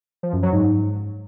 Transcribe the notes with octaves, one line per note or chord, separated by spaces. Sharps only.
F3
F#2
F#3
G#2